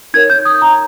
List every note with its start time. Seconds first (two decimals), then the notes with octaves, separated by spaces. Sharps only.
0.14 D#4 A#4 C#5 G#6
0.30 G6
0.45 D#6
0.62 A#5